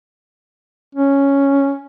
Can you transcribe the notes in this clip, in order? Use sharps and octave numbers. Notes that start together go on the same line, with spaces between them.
C#4